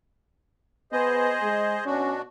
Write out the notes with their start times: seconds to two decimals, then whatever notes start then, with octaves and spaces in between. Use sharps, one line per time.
0.92 B3 G#4 C5 D#5
1.42 G#3
1.86 B2 C#4 D4 F#4